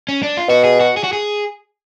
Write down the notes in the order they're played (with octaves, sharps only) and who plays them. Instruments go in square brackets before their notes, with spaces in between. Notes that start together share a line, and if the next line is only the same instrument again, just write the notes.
[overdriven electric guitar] C#4
D4
F4
[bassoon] B2 [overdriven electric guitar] F#4
[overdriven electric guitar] G#4
F#4
G#4
F#4
G#4